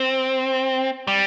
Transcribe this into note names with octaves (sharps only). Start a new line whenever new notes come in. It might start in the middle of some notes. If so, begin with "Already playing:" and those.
Already playing: C4
G3